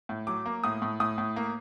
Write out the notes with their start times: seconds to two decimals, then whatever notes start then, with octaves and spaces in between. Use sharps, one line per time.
0.09 A2
0.27 F#3 D6
0.46 A#3
0.64 A2 D#6
0.82 A2
1.00 A2 D#6
1.18 A2
1.36 A#3